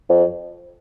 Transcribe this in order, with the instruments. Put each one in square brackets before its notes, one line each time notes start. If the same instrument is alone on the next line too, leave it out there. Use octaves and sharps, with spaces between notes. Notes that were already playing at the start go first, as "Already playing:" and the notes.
[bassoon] F2